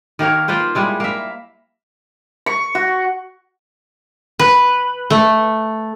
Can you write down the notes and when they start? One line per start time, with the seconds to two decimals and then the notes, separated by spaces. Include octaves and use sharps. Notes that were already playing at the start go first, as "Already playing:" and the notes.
0.19 D#3 A#3 A#4 C#5
0.48 A#3 F4 B4 C5
0.75 G3 G#3 E4
1.00 A#3 E5
2.46 C#6
2.75 F#4
4.39 B4
5.10 A3